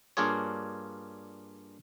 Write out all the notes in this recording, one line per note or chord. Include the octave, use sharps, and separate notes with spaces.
G2 A#3 D4 F4 G#4 C#5